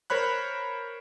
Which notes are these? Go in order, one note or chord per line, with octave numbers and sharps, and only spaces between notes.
A#4 C5 C#5 B5 F#6